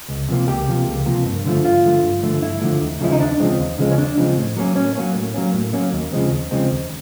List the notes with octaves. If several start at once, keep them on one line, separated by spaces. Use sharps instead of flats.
C#2
C3 F3 A#3
C#2 G4
C3 F3 A#3
C#2
C3 F3 A#3
G2
D3 F3 A3
G2 F4
D3 F3 A3
G2
D3 F3 A3
G2 E4
D3 F3 A3
D#2
C#3 F3 G#3 C4 E4
D#4
D#2 D4
C#3 F3 G#3 C4
D#2
C#3 F3 G#3 C4
C#4
D#2 D4
C#3 F3 G#3 C4
A2
F#3 A#3 C#4
A2 C#4
F#3 A#3 C#4
A2
F#3 A#3 C#4
A2
F#3 A#3 C#4
D#2
C#3 F3 G#3 C4
D#2
C#3 F3 G#3 C4
D#2